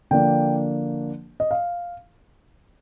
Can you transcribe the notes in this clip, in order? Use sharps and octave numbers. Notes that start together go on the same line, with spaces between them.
D3 F3 A#3 D4 G5
D#5
F5